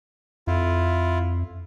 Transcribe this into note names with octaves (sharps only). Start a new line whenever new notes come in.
F2 E4 F4